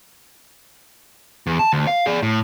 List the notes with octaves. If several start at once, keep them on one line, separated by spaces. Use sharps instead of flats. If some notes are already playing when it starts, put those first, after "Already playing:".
E2
A5
D2
F5
G#4 D5
A2